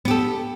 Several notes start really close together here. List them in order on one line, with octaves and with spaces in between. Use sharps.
B3 G4 A4